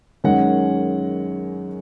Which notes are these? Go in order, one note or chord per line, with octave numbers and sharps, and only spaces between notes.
F#2 D#3 G#3 C#4 F#5